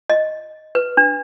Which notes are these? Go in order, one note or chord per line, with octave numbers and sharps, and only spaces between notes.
D#5
B4
D4